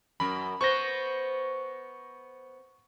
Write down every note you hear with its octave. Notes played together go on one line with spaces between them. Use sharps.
F#2 A#4 B5
B3 C5 C#6 A#6